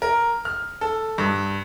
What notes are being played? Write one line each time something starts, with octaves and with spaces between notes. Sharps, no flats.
A#4
F6
A4
G2